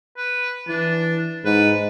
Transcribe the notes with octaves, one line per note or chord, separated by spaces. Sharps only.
B4
E3 D4
G#2 B4